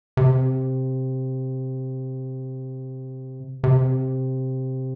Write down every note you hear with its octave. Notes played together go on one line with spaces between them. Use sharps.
C3
C3